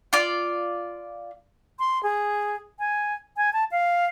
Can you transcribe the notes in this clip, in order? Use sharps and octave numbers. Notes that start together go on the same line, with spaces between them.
F4 D5
C6
G#4
G#5
G#5
A5
F5